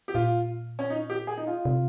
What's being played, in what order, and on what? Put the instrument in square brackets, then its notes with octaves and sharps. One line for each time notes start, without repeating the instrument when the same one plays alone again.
[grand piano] G4
[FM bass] A#2 [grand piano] F4
[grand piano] C#4
D#4
G4
G#4
D#4
F4
[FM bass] C3